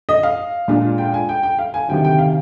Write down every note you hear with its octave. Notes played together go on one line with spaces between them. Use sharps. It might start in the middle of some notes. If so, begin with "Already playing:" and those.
D#5
F5
A#2 G#3 D4 F4
G5
G#5
G5
G5
F5
G#5
D2 C3 D#3 G5
G5
F5